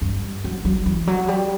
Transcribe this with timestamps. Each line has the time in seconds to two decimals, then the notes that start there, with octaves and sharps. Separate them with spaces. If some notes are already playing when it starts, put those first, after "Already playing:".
0.02 G2
0.44 F#3
0.65 F#3
0.86 E3
1.07 F#3
1.28 G3